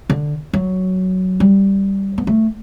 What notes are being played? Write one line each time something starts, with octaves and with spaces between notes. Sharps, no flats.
D3
F#3
G3
B3
A3